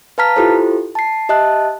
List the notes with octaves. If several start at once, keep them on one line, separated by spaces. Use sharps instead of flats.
B4 F5 A5 A#5 F6 B6
E4 F4 G4 A4 C5
A5 C7
G4 D#5 E5 A5 F#6